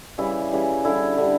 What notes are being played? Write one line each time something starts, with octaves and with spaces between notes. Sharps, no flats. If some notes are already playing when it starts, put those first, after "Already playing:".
C#3 E3 G3 E4
C#3 E3 G3
D3 G3 E4
D3 G3